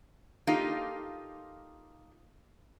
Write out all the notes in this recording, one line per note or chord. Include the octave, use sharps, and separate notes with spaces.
A#3 D#4 F4 G4 A4